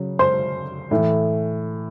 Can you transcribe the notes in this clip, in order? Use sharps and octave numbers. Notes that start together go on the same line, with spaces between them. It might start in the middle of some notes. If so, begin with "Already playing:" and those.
Already playing: C#3 F#3
C5 C6
A2 E3